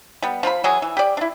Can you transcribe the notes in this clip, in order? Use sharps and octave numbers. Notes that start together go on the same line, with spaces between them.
G3 B3
F3 F4 F#4 B5
E3 F#3 G#4 G#5
E3
G4 D5
D4 E4